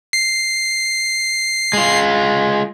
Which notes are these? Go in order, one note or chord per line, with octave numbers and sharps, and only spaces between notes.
C7
G#3 F4